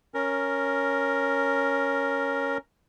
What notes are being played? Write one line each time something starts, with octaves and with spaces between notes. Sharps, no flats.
C#4 A#4